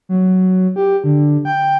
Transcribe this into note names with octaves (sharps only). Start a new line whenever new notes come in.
F#3
G4
D3
G5